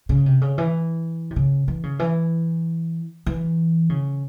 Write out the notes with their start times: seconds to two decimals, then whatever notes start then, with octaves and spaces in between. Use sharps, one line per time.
0.09 C#3
0.26 C3
0.41 C#3
0.58 E3
1.31 C3
1.36 C#3
1.68 E3
1.83 C#3
1.99 E3
3.26 E3
3.90 C#3